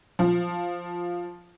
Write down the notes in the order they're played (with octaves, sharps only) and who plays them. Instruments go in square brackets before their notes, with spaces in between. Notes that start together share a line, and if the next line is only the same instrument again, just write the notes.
[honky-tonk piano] F3